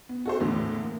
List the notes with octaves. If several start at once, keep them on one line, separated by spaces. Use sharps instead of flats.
B3
F#4 A4 C5
E2 A2 D3
A#3